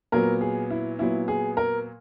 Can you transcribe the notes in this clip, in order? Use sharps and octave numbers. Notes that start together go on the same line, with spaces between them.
A#2 F#3 B3 A#4
G#4
E4
A#2 F#3 B3 E4
G#4
A#4